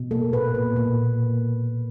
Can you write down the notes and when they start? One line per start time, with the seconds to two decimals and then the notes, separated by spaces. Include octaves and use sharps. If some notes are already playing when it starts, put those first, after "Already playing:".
Already playing: B2
0.11 A#3 A4
0.33 A#2 B4
0.54 A#2
0.76 A#2